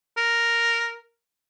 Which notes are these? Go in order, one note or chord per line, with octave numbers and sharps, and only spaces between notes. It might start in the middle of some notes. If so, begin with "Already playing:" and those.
A#4